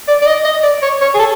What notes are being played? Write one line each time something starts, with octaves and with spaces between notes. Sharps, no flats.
D5
D5
D#5
D#5
D5
C#5
C#5
G#4
A4